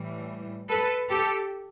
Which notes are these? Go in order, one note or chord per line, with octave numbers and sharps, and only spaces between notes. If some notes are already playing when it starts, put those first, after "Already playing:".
Already playing: A2 E3 G3
A4 B4
G4 A4